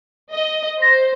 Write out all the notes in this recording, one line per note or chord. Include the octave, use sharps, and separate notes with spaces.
D#5
C5 A#6